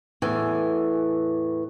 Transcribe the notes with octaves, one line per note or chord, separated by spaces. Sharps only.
E2 A2 E3 G#5